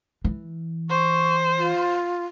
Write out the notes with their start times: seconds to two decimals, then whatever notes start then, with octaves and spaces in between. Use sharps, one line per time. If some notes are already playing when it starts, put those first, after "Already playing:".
0.24 E3
0.90 C5 C#6
1.58 F4